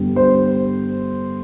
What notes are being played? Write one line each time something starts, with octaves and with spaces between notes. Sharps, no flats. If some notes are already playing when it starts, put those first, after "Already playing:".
Already playing: G2 D3 G3 B3
C5